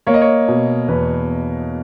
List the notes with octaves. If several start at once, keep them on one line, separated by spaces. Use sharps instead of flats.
A#3 C#5
D#5
C#5
B2
E2 B4